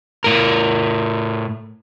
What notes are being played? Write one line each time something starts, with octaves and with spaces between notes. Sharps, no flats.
A2 A#4